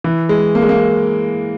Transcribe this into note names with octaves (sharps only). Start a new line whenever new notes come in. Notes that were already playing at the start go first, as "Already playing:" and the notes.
E3
G#3
A#3
G#3
A#3